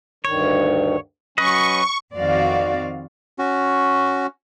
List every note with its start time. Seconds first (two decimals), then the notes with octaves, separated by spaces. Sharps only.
0.25 D2 G2 D#3 C#5
1.38 F#3 C#4 B4 D#5 C#6
2.15 F2 D#3 C4 F#4 D5 F5
3.39 C#4 F#4